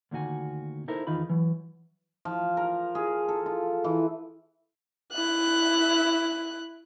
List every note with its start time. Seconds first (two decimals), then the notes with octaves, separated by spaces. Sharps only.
0.11 D2 A#2 D#3 F#4 G#5
0.88 D#4 E4 A4 A#4 C5 E5
1.07 E2 D#3 D#4 F4 B5
1.29 E3 F#3
2.25 F3
2.57 A#4
2.95 G#4
3.28 A4
3.46 F4
3.84 E3
5.13 E4 F#6